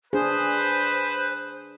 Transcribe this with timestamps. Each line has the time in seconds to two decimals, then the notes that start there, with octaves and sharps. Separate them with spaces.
0.13 D4 G#4 B4 C5